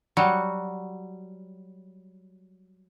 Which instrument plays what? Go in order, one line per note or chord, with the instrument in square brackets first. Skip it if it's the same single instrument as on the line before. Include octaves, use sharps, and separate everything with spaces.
[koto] F#3 G3 F#4